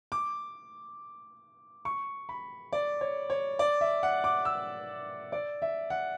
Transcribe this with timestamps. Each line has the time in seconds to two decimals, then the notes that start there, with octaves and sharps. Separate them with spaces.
0.12 D6
1.85 C#6
2.29 B5
2.72 D5
3.01 C#5
3.30 C#5
3.59 D5
3.81 E5
4.03 F#5
4.24 D6
4.45 E6
5.32 D5
5.62 E5
5.90 F#5